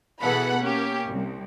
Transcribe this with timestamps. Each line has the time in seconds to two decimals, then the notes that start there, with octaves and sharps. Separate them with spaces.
0.21 B2 E3 G#4 A4 F#5 B5
0.58 A#3 C#4 G4
1.05 C2